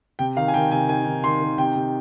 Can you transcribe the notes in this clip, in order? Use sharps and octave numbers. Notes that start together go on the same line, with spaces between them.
C3 G5
D#3 F5
G#5
D#3 G5
C3 G#5
D#3 G#5
D#3
D#3 C6
D#3
C3 G5
C3